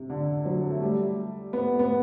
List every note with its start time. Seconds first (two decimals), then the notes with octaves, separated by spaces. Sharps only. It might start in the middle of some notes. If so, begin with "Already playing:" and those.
Already playing: C3
0.10 D3
0.45 F#3
0.70 A3
0.82 G3
1.53 B3
1.79 B3